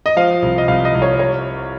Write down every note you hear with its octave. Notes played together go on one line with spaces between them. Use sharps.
D#5
F3 F5
C2
D#5
C2 F5
D#5
C2
C#5
C#5